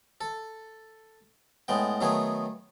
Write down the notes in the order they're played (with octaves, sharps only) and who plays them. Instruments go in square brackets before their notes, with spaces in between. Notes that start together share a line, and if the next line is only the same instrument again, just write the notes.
[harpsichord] A4
A2 G#3 B3 G5
D#3 F#3 A3 B3 G#4